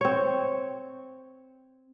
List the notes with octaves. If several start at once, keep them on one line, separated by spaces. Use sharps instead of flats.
C4 C#5